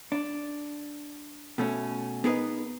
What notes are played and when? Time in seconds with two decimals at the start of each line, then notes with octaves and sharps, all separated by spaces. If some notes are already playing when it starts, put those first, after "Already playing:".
0.12 D4
1.58 B2 A3 C#4
2.24 B3 D#4 G#4 A#4 B4 D#5